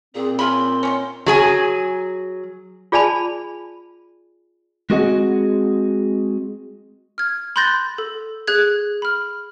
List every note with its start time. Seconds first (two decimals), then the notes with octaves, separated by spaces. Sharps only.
0.15 A#2 C4 G#4
0.39 C#4 F4 B5 C6
0.83 D#3 F#3 C#4
1.26 F#3 G#4 G#5
2.92 F4 G#4 D5 G#5 A5 B5
4.90 G#3 C4 F#4 G#4 D#5 F#5
7.18 F6 G#6
7.56 B5 C6 F#6 G6 A6 A#6
7.98 A4
8.47 G#4 F#6 G#6
9.02 B5 F6